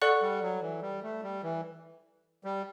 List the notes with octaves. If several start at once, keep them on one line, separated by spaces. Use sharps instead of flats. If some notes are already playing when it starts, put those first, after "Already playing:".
A4 D5 F#5 C#6 F#6
G3
F#3
E3
G3
A3
G3
E3
G3